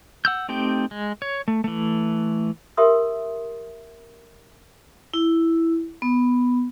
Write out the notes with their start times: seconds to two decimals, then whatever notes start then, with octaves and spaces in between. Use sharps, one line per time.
0.25 F#5 E6 G6
0.49 A3 C4 D#4 G4 G5
0.91 G#3
1.22 C#5
1.48 A3
1.64 E3 A3
2.77 G4 A#4 E5 C6 D#6
5.14 E4
6.02 B3